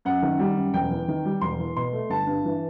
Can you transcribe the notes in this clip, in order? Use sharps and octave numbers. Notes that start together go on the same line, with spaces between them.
F#2 F#5
D#3
G3
F#2
E1 G5
E2
D#3
G3
E1 C6
E2
B2 C6
A3
G1 A5
G2
E3